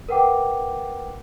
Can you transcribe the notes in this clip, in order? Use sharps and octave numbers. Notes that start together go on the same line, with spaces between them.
A#4 B4 F#5 G5 D6